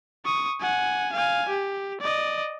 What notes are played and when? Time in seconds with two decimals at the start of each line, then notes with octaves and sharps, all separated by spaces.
0.25 C#6 D#6
0.60 F#5 G#5
1.13 F5 G#5
1.49 G4
2.01 D5 D#5